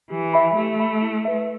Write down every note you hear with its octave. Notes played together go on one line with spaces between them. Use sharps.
E3 G4
E5 B5
A3 G4
E5 B5
E4
B4 E5